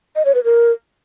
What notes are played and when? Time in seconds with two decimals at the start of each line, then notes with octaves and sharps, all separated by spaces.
0.16 D#5
0.25 C#5
0.35 B4
0.44 A#4